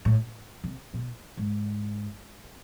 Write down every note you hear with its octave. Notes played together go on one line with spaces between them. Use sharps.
A2
C3
B2
G#2